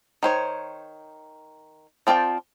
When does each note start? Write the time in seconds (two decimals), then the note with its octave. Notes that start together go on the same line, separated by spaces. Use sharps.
0.23 D#3 C5 C#5
2.07 F3 C4 F4 D5 G5